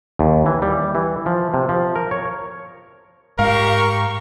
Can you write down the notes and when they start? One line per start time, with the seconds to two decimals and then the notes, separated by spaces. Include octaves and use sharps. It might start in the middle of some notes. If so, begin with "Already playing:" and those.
0.19 D#2
0.46 E3
0.62 G3
0.95 E3
1.26 F3
1.54 C3
1.69 F3
1.95 A#4
2.11 C#5
3.39 G#2 G4 A#4 F5 C#6